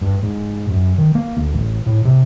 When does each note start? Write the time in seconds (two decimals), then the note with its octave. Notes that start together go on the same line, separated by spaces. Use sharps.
0.01 G2
0.23 G#2
0.70 F#2
0.98 D#3
1.15 A#3
1.37 D2
1.54 A1
1.86 A2
2.05 C3